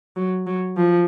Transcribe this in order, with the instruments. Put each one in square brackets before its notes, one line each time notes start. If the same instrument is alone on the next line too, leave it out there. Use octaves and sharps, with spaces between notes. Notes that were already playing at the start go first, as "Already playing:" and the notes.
[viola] F#3
F#3
F3